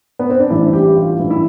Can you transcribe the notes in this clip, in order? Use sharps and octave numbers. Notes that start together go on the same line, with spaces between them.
B3
C4
D4
A1 G2 E3 E4
G4
F4
A1 G2 E3
E4